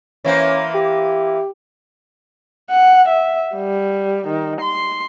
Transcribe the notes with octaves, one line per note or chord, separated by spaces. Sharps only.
E3 A#3 C#4 C5
G4
F#5
E5
G3
D#3
C6